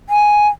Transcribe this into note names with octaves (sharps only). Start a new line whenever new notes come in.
G#5